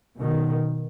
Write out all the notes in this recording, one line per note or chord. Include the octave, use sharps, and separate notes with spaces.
B2 D#3